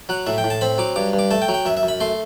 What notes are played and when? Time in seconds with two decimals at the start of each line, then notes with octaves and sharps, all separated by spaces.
0.09 F#3 F#5
0.26 A2 E5
0.38 G5
0.44 A2
0.50 A5
0.61 C4 B5
0.78 F#3 D6
0.96 G2 D6
1.13 G2
1.19 D6
1.31 A3 A5
1.42 G5
1.48 F#3
1.54 G5
1.65 F#2 E5
1.77 E5
1.83 F#2
1.88 B5
2.00 A3 C6